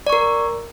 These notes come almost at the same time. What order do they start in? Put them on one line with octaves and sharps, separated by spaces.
D5 C#6 A#4